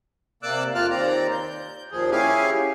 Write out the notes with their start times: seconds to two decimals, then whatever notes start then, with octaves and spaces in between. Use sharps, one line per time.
0.43 C3 A#3 D5 D6 E6 F#6
0.75 F2 A#3 F4 A5 F6 F#6
0.90 D#2 C4 D5 A#5
1.31 G6
1.92 D#2 A#2 F3 G#4
2.12 C#4 E4 G4 G#4 F5 G#5